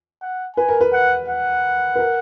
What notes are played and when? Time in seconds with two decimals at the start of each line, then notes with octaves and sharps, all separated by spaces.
0.22 F#5
0.56 B4 G#5
0.69 A#4
0.81 B4
0.93 F#5
1.28 F#5
1.95 B4
1.99 A#4